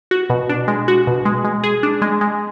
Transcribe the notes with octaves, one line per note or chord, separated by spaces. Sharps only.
F#4
B2
D4
G#3
F#4
B2
G#3
G#3
G#4
D4
G#3
G#3